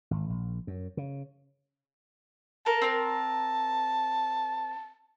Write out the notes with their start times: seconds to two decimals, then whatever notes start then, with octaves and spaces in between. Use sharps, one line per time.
0.11 G#1
0.30 A#1
0.67 F#2
0.97 C#3
2.66 A4 A#4 A5
2.82 C4 A#4